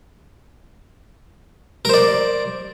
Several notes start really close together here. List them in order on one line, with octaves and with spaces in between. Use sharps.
A#4 C5 D5